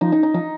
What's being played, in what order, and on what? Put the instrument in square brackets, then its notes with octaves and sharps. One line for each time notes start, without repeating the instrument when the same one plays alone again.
[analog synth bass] F3 [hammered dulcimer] D#4
[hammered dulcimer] D#4
D#4
[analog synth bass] F3 [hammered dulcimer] D#4